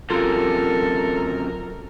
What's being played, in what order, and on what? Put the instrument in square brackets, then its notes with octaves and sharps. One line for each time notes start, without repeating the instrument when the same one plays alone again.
[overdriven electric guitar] F#2 C3 [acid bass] F4 [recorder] A4 [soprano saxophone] A#4